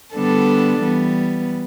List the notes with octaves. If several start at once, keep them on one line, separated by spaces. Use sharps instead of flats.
D3 G3 B3 D4 A4
E3 G3 B3